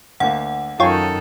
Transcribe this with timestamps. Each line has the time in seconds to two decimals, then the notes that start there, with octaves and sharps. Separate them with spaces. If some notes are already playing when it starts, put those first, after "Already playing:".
0.20 D2 A#3 F5 F#5
0.80 F#2 D#3 F4 A4 C#5 G5 G#5